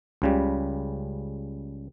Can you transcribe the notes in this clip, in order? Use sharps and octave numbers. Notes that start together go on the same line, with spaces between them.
C#2 C#3 G3